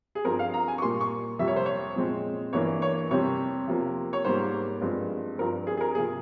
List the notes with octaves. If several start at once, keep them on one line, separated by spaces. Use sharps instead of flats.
G#4
G2 F3 C4 A#4
F5
A#5
G#5
C#6
A#2 G3 A#3 C6
C#6
F2 C3 G3 E5
C#5
C5
C#5
A#2 F3 G#3 C4
G2 E3 A#3 C#5
C#5
F2 C3 G3 C4 C#5
C3 F3 A#3
C#5
G#2 G3 A#3 C5
G2 F3 G#3 C4
G2 F3 C4 A#4
G#4
G#4
A#4
C3 F3 A#3 G#4